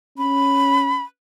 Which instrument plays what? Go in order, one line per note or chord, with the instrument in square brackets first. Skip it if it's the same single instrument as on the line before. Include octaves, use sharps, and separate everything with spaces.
[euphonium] C#4 [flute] B5